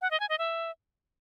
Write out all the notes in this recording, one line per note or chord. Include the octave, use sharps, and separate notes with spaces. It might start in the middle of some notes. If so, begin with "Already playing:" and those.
F#5
D#5
G#5
D#5
E5